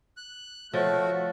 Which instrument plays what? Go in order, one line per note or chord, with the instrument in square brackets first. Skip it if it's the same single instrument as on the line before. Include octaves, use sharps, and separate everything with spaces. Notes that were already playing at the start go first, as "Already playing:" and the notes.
[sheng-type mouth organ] F#6
[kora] F3 [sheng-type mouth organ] A3 F#4 [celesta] C#5 F6 A6